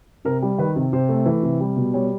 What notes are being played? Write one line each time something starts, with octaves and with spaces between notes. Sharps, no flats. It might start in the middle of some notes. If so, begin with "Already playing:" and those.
C3 A#4
G3
D#3 B4
C3
C3 C5
A3
E3
C3
G3
B2
G3 C#5